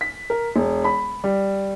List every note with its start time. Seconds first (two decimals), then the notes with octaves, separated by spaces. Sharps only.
0.01 B6
0.30 A#4
0.56 E1
0.84 B5
1.24 G3